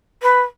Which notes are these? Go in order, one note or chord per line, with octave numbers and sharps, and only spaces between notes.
B4